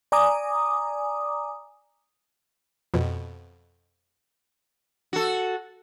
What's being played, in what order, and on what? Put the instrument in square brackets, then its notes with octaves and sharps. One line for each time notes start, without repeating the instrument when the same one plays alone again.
[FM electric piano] D5 G#5 A#5 D6 D#6
[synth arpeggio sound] F2 B2
[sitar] F#4 A4